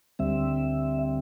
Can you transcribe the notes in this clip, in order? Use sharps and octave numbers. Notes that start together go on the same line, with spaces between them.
D2 D3 G3 C4 E5